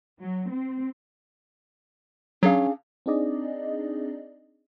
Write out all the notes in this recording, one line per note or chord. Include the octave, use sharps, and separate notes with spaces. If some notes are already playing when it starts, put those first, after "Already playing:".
F#3
C4
F#3 C#4 D4 G#4 F5
C4 D4 D#4 G#4 D5 D#5